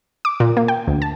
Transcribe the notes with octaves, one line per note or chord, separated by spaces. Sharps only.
D6
A#2
A#3
G5
D2
A5